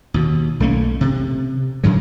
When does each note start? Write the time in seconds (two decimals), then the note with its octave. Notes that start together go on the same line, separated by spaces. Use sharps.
0.14 D#2 B2
0.60 B1 A3 A#3 C#4
1.01 C3
1.84 F#2 D3 F#3